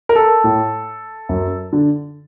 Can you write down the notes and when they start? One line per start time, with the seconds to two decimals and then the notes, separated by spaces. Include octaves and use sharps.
0.09 A#4
0.15 A4
0.44 A2
1.29 F#2
1.73 D3